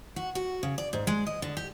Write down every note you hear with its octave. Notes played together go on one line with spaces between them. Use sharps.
F#4
F#4
C#3
D5
G#2
G#3
D#5
D3
G4